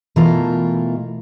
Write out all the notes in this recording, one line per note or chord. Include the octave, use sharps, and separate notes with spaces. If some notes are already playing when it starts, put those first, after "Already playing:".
B2 E3 A3 F4 A4 A#4